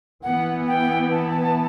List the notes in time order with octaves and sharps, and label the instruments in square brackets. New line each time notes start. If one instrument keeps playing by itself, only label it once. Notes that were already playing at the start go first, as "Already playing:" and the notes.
[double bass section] E3 B3 [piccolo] F#5
[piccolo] G5
A5